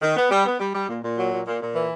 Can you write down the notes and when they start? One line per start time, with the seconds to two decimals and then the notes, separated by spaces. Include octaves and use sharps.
0.02 D#3
0.16 B3
0.31 G3
0.46 B3
0.59 G3
0.75 G3
0.89 A#2
1.04 A#2
1.18 F#3
1.32 A#2
1.47 A#2
1.61 A#2
1.75 E3